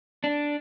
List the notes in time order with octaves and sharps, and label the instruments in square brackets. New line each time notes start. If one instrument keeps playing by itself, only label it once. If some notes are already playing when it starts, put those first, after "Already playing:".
[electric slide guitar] D4